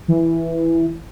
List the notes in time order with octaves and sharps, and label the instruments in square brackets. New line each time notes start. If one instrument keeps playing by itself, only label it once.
[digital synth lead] E3